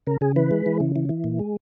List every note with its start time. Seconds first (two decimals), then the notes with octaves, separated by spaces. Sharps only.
0.07 C#3 A#4
0.21 C#3 G#4
0.36 E3 B4
0.51 G#3
0.66 E3
0.80 C#3
0.96 E3
1.09 E3
1.24 A#2
1.39 G#3